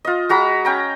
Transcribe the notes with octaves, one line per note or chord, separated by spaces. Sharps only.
F4 D#5
G#3 F#4 A#5 B5
C#4 G5 A#5